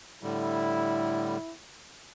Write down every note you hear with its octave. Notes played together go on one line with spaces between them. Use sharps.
A2 D3 G3 E4